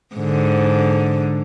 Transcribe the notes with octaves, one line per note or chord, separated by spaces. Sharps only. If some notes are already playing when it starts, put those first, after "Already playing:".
G#2 D3